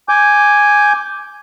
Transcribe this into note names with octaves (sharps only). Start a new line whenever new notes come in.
G#5 D6 G6